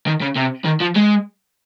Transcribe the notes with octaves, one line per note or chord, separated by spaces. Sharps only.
D#3
C#3
C3
D#3
F3
G#3